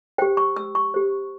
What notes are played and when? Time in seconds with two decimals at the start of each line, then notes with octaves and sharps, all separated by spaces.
0.18 G4 C5 G5
0.37 C#6
0.56 E6
0.75 C#6
0.94 G4 C5